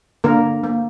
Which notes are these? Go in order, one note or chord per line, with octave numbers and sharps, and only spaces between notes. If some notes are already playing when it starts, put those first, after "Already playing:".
D3 A#3 A#4
A#3